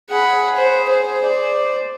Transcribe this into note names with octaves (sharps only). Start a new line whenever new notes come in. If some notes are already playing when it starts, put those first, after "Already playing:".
G#4 F#5 B5
C5
C5
D5